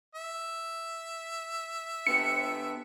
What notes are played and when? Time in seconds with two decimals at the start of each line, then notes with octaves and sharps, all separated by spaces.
0.15 E5
2.07 D3 B3 G4 C#7